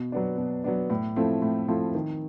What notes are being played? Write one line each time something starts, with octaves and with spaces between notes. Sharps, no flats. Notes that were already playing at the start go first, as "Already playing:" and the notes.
Already playing: B2
F#3 B3 D4
B2
F#3 B3 D4
A2
F3 A3 C4 E4
A2
F3 A3 C4 E4
D#3